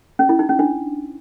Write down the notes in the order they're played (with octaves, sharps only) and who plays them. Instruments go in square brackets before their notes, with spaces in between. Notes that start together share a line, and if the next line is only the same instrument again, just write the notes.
[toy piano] C#4
E4
D#4
C#4
D4